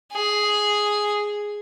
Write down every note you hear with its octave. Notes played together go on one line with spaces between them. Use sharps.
G#4